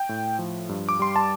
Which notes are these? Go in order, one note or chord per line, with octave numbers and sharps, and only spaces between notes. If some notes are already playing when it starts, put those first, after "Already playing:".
Already playing: G5
A2
F3
G2
D6
G3 C6
A5